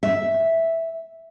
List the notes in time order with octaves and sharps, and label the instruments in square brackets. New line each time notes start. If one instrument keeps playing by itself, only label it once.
[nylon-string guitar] E5